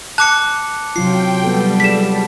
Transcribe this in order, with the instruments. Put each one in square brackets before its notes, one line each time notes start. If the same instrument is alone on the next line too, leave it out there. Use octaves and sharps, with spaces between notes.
[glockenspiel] A5 D6 C#7 [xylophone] F#6
[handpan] C3 F#3 F4 [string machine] G5 [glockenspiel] C7
[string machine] G3 [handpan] B3 A4
[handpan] G#3 A4 [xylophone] B6 E7